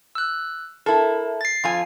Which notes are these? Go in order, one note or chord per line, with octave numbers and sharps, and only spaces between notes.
E6 F#6
E4 A4 A#4
A6 C7
F2 F4 G#5